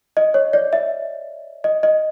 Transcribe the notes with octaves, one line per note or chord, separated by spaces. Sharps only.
D#5
C#5
D5
E5
D#5
D#5